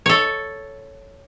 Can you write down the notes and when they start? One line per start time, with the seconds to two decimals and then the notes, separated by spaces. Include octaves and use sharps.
0.06 A4 C#5